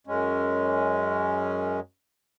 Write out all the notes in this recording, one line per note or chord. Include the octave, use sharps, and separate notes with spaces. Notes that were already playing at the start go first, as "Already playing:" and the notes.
F#2 G#3 C#4